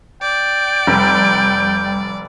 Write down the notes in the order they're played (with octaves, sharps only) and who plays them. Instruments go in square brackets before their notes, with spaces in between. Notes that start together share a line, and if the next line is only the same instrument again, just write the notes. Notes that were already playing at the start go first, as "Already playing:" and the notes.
[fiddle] D5 [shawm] G5
[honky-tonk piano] F1 [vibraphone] G3